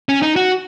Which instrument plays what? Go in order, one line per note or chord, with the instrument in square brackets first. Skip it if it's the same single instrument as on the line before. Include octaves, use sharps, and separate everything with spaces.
[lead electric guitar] C#4
D#4
F#4